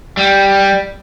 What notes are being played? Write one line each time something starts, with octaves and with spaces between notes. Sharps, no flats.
G3